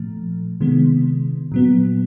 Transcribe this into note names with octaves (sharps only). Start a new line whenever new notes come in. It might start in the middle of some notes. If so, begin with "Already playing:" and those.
Already playing: A#2 F3 A3
C3 D#3 G#3 B3
A#2 F#3 B3